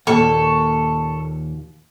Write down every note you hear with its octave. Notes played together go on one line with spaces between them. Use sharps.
D#2 A#2 A4 C#6